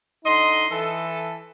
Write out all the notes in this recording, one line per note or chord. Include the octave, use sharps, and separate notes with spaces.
D3 D#4 D#5 C6
E3 A4